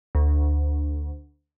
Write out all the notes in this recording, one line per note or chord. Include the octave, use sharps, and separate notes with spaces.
D2